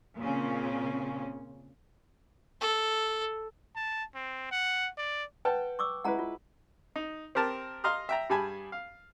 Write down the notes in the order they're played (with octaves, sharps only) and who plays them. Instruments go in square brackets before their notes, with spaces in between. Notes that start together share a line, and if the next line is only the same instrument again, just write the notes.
[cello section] A#2 C#3 C4 C#4
[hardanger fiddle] A4
[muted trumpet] A5
C4
F#5
D5
[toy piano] B4 [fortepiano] F#5 G5 A5
[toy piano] C#6 D6 E6
[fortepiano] G#3 E4 B4 [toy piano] F#5 A#5
[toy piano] F4
[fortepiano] D#4
C4 G4 A#4 A5
D#5 F5 A#5 C6 D#6 F6
E5 G5 A#5
G2 G3 G#4 G#5 A5 B5
F5